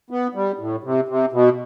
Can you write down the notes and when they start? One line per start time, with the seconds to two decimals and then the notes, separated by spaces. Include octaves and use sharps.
0.10 B3
0.35 G3
0.59 A2
0.84 C3
1.09 C3
1.32 B2